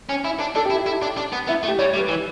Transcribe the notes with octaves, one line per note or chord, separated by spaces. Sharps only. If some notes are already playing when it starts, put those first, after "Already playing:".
C#4
E4
D4
D4 A4
G4
E4
G4
E4
D4
D4
B3
B3 E4
A3
G4
G3 C#5
C#5
G3
B4
E3